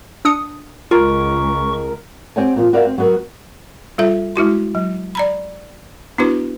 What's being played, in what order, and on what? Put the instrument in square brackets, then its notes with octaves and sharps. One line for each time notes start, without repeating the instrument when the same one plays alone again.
[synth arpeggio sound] D4 D#6 C#7
[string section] C#2 [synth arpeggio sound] F4 [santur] A#4 [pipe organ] C#6
[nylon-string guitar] C4 G4 C#5 F#5 G#5
A#2 E3 F3
F#4 A#4 B4 D5 E5 F5
C4
F#3 B3 F#4 A#4
[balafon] G3 F4 A4 E5
G#3 E4 F#4 C6
F#3
D5 A#5 B5
B3 D4 E4 F#4 B4